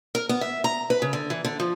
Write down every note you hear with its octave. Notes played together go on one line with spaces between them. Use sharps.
A#4
B3
E5
A#5
B4
C#3
D3
E3
D3
F3